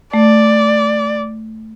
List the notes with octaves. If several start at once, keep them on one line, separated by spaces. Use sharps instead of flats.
A3 D5